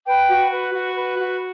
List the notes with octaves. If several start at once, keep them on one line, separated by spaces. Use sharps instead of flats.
B4 G5
F#4
B4
F#4
B4
F#4